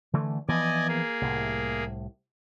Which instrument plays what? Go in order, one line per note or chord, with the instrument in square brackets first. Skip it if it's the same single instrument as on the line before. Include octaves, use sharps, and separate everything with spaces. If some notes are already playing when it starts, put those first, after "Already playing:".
[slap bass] D3 E3 A3
[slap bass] E3 F3 B3 [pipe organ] D5 D#5 G#5
[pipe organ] A#3 G#4
[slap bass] C2 A2